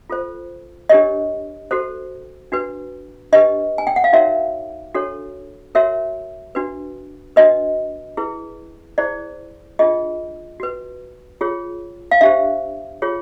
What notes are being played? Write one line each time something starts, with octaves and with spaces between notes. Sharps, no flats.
F4 A4 C5
D4 G4 A#4 C#5 D#5
F#4 A4 C5
D4 F#4 B4
D4 G4 B4 D#5
G#5
G5
F#5
F5
D#4 F#4 A#4 C#5 E5
D4 F#4 A4 C#5
F#4 A#4 C#5 E5
D4 F#4 B4
D4 F#4 B4 D#5
E4 G#4 B4
E4 G#4 C5 D5
D4 F4 G#4 D#5
F#4 B4
F4 G#4 C#5
F5
D4 G4 C5 E5
F4 G#4 C#5